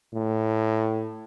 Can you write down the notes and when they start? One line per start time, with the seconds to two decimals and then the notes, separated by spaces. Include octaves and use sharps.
0.14 A2